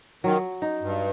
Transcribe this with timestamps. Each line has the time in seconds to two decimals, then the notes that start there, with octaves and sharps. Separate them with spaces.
0.24 D#3 F#3
0.62 D#4
0.82 G2